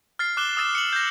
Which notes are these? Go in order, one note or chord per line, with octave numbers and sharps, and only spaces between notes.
F6 A6 C7
D6 F#6 E7 G7
D#6 E6 A6 E7
C#7 F#7
G6 A#6